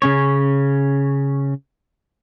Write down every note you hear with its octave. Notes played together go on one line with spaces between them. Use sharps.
C#3 C#4 C#5